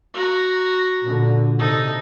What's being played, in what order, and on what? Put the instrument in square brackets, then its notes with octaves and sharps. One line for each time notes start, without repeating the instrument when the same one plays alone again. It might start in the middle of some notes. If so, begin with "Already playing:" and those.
[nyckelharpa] F#4 A#5
[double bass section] A#2 D3
[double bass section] C3 [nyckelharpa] D#4 A4